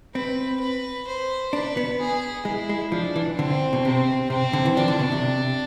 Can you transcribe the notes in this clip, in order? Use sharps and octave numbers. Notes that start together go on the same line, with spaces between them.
C4 B4
B4
C5
D4 B4
B3
G#4
G#3 E4
G#3
F3 D4
E3
D3 C4
B2
C3 C4
C3 C4
D3
E3
F3 D4
D3
B2
C3